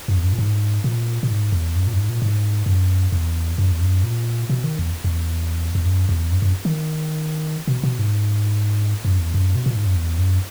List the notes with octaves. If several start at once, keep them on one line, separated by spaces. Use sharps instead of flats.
F#2
E2
F#2
A#2
G#2
A#2
A#2
G#2
E2
F#2
A#2
F#2
G#2
A#2
G#2
F#2
E2
F#2
E2
F#2
A#2
B2
D#3
E2
E2
E2
F#2
E2
F#2
F#2
D#3
B2
B2
G#2
F#2
E2
F#2
B2
A#2
G#2
F#2
E2
F#2